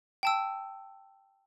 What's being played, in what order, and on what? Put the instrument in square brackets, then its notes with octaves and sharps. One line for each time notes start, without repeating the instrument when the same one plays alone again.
[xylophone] G5 A5 E6